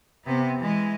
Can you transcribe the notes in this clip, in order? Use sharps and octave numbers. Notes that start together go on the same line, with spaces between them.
C3 B3
E3 G#3